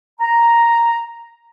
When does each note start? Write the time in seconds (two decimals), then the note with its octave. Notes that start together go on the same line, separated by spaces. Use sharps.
0.20 A#5